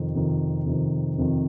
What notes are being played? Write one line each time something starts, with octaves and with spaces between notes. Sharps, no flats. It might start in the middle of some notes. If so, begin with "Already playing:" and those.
Already playing: F2 C3 D#3
F2 C3 D#3
F2 C3 D#3
F2 C3 D#3